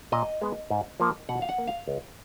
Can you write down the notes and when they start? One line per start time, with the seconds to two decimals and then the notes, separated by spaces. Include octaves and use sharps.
0.12 A#2 D#5
0.42 G#3 B3
0.70 G#2
1.00 F3 A#3
1.29 B2 F#5
1.42 F5
1.49 F#5
1.58 A#3
1.67 F5
1.88 C#2